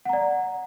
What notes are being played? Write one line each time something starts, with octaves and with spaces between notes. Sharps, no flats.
D5 F#5 A#5